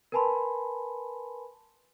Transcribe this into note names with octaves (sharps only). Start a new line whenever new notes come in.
A#4 B4 G#5 A5 B5 C6